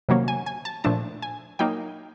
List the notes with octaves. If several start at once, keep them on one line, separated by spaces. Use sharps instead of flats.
C3 D#3 F#3 A#3 C#4
G#5
G#5
A5
A#2 F3 A3 D4 A5
G#5
F#3 A#3 D#4 G5